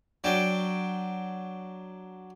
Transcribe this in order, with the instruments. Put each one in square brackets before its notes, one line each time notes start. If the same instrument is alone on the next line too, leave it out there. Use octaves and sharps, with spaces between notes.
[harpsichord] F#3 D4 G5